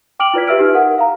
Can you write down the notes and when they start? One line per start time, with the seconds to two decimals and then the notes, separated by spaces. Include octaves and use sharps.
0.20 G5 D6 F6 D7 F7 F#7
0.34 E4 F4 B4 D5 G#6 B6
0.47 G4 B4 E5 E6 F6 D7
0.59 D#4 G4
0.75 A#4 F#5
0.98 F5 A#5